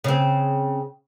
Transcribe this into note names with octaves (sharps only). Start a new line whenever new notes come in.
C#3 C4